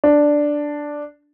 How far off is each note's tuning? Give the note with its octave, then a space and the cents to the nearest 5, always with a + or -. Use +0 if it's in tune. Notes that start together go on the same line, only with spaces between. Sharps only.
D4 +0